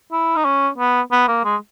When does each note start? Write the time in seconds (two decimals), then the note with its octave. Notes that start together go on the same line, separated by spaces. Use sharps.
0.12 E4
0.36 D#4
0.45 C#4
0.78 B3
1.12 B3
1.28 A#3
1.44 G#3